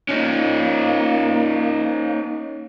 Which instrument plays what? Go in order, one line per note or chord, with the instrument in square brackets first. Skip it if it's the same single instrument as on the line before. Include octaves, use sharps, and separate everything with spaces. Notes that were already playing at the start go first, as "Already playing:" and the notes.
[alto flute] A#3 [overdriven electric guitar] C#4 D#4